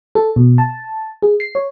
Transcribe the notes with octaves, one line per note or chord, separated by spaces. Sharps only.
A4
B2
A5
G#4
C7
C#5